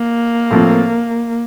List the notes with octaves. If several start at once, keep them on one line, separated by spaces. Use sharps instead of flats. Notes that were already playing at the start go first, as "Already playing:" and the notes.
Already playing: A#3
A2 F3 C4